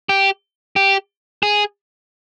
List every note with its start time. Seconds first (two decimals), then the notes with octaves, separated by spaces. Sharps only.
0.09 G4
0.76 G4
1.43 G#4